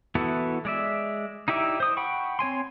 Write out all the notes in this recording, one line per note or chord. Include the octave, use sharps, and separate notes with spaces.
E3 B3 E4 F#4 A4
G#3 D5 E5
D#4 E4 G4 D5 E5
C5 D#6
F#5 G5 B5 C#6
C4 C#5 G#5 C6